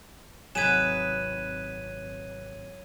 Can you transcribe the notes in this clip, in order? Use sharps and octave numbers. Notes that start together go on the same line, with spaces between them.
G#1 C3 F#3 G#4 B4 G#6 D#7 E7